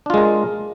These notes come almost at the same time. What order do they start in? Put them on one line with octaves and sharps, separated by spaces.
D4 F4 G#3 A#4